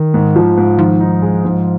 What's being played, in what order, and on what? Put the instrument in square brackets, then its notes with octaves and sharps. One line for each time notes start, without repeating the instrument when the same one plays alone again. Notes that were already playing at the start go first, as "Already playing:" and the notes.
Already playing: [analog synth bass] D#3
[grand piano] G#2
F3
G#2
[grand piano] D#3 [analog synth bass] F3
[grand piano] D#4
G#3
G#2